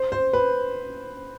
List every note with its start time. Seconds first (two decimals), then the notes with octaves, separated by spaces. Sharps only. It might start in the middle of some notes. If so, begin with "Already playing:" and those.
Already playing: C5
0.12 C5
0.33 B4